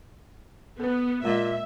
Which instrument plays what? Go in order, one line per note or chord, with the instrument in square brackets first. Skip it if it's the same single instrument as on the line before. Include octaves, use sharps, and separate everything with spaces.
[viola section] B3 [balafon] A4 B4
[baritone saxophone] A#2 [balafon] G#3 D#5 [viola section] E5